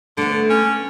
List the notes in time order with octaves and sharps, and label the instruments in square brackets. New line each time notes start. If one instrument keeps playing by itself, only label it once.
[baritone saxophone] D3 [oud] A3 B3
[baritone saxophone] C#4